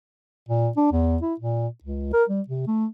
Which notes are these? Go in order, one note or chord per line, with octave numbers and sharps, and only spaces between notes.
A#2
D4
E2
E4
A#2
C#2
A#4
G3
C3
A3